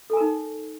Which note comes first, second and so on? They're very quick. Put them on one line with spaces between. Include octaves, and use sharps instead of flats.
A4 G#5 A#4 D#4